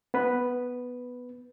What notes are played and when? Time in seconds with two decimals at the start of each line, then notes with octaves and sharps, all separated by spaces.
0.14 B3 B4